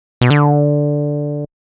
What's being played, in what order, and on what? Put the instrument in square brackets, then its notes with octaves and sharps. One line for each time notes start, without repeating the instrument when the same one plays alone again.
[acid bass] B2
D3